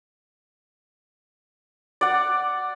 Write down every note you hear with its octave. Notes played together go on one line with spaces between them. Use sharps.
D5 F#5